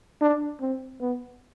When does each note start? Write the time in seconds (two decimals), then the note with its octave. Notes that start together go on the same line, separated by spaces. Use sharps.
0.22 D4
0.61 C4
1.01 B3